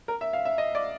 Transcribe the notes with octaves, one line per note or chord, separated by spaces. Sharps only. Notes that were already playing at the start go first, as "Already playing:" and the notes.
A#4
E5
F5
E5
D#5
D5